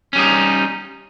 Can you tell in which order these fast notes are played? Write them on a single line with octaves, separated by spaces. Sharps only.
C#4 G3 D#4